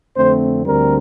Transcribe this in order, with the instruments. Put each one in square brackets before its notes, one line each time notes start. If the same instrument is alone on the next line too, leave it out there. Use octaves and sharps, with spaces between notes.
[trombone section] F2 D3 A3 C4 C5
D2 D3 G3 C4 A#4